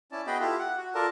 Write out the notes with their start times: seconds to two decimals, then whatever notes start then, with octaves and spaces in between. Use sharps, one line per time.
0.12 C#4 E4 D5 A5
0.27 B3 F#4 G#4 D#5 G5 B5
0.40 E4 F4 G4 A4
0.59 F#5
0.77 F#4
0.95 F4 A4 A#4 D5 A5